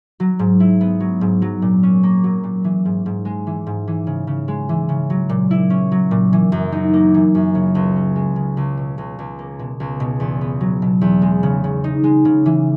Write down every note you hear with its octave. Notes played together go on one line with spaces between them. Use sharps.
F#3
G#2
E4
B3
F#3
G#2
F#3
A#2
C#4
A#3
F#3
A#2
E3
G#2
G#2
G#3
E3
G#2
E3
C#3
C#3
G#3
E3
C#3
F#3
A#2
E4
C#4
F#3
A#2
E3
F#2
D#4
A#3
E3
F#2
C#3
C#2
C#4
G#3
C#3
C#2
B2
C#2
C#2
A#3
B2
C#2
B2
E2
B3
F#3
B2
E2
G#3
C#3
C#3
D#4
G#3
C#3
E3